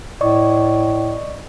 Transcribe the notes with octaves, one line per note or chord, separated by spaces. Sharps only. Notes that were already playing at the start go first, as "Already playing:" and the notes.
A2 D5 D#5 C#6